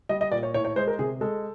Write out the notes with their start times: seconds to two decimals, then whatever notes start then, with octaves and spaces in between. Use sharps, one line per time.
0.09 G3 D#5
0.21 D#5
0.32 A#2 D5
0.43 C#5
0.54 A2 C#5
0.65 C#5
0.76 G#3 C5
0.88 A#4
0.99 C3 G#4
1.21 G#3 A4